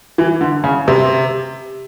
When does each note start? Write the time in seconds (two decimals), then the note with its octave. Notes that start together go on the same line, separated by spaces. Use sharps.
0.18 E3
0.41 D3
0.64 C#3
0.88 C3